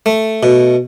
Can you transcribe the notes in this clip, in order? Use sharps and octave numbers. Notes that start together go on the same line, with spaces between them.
A3
B2